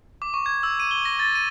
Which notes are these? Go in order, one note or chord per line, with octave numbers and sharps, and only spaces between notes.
D6
C#6
G#6
E6
D#7
G7
A#6
A6
D#7